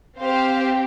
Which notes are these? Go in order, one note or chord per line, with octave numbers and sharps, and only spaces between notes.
C4 G4 C5 F5